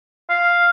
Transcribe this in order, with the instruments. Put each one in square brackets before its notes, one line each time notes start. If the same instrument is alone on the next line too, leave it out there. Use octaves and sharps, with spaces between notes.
[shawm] F5